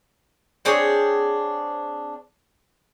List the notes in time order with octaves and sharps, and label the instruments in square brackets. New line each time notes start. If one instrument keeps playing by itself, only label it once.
[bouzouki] C4 D4 G#4 C#5